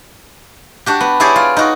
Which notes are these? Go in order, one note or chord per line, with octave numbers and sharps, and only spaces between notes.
D4 F#4 G4
B3
E4 G4 G#4 C#5 D5
F4
D#4 F#4